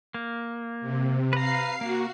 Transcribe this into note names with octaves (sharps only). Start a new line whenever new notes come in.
A#3
C3
B4 F5 A#5 C7
A#3 F#4